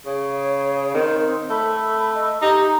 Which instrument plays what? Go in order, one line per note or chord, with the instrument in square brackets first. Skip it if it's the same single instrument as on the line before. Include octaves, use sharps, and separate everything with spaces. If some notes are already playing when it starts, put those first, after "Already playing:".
[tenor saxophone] C#3 [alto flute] C#5
[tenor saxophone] D#3 [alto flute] C4
[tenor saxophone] A3 [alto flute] B5
[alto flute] D#5
[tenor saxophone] D#4 [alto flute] G4